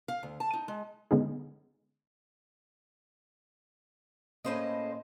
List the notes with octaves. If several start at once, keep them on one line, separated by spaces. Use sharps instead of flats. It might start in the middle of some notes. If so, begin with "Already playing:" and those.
F5
D2
A5
D#4
G#3
D3 G#3 B3 C#4 D#4 G#4
A2 A#3 C#4 C5 D#5